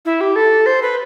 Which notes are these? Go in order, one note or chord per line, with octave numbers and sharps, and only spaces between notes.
E4
G4
A4
C5
B4